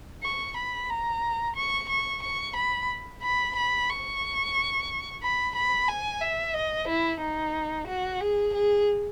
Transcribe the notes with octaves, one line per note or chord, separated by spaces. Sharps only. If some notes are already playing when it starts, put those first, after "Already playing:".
C#6
B5
A#5
C#6
C#6
C#6
B5
B5
B5
C#6
B5
B5
G#5
E5
D#5
E4
D#4
F#4
G#4
G#4